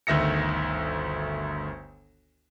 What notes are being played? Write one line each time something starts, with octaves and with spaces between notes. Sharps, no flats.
G1 D2 D#3 E5 A#6 C#7